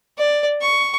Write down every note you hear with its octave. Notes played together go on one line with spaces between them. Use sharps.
D5
C#6